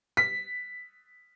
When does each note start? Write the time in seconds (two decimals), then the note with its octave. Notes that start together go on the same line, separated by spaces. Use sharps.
0.17 B6